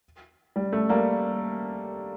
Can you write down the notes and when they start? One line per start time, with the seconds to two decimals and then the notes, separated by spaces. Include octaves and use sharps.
0.56 G3
0.73 A3
0.89 G3 A#3